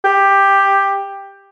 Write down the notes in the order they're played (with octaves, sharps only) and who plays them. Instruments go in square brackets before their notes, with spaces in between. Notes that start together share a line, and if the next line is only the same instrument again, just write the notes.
[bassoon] G4